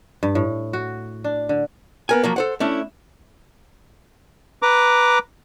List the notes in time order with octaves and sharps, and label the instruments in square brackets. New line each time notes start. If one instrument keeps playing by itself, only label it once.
[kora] G2
A2
F#4
D4
D3
[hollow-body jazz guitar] B3 A#4 G#5
F3 F#3 A#3
A4 C5 F#5
A3 C#4 D4 E4
[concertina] B4 A#5 D6